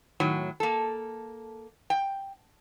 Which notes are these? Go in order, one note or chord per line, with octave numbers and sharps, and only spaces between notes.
A2 D#3 F#3
A#3 A4
G5